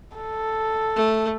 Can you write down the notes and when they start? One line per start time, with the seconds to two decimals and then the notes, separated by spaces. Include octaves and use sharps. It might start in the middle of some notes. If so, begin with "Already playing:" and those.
0.16 A4
0.95 A3